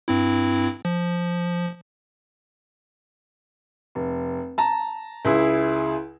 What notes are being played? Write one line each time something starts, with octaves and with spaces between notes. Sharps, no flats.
G2 C4 E4
F3
F1
A5 A#5
C#2 E4 G#4